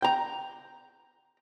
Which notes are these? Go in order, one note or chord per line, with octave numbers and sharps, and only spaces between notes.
G5 A#5